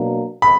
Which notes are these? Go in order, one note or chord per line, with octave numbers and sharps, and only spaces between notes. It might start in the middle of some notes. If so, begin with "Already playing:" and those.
Already playing: B2 F#3 A#3 D4
B5